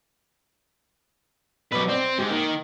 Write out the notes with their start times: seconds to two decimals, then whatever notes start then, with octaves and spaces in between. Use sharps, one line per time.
1.72 F#2 B2 B4 D6
1.88 C4 D5
2.18 G#2 G4
2.30 D#3 A#3